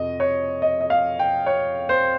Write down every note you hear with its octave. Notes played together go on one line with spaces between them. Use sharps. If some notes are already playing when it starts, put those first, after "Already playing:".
Already playing: F2 C3 D#5
C#5
D#5
D#5
F5
G5
C#5
C5